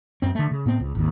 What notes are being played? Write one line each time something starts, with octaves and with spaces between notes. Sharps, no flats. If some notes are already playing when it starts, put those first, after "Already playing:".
F#2 C4
D3 A3
C#3
A2 B3 C4
C#2
G#1 D#2